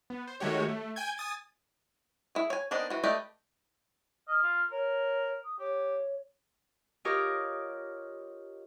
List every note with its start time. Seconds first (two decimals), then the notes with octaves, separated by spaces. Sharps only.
0.10 B3
0.27 C5
0.40 D#3 G#3 A3 F#4 G4 C#5
0.69 A3
0.96 G5 G#5 G6 G#6
1.18 G#5 D#6 A6
2.35 E4 G#4
2.50 C#5 G#5
2.71 B3 C4 D4 D#4 A#4
2.90 E3 F#4
3.04 A3 G4 B4 D5 D#5
4.28 D#5 F6
4.43 F4
4.71 A#4 C#5
5.44 D#6
5.59 G4 C#5
7.05 F4 G4 A#4 C#5 D#5 D6